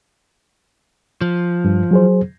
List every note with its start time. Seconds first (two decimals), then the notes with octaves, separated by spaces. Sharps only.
1.21 F3
1.65 G2
1.91 F#3 G#4 C5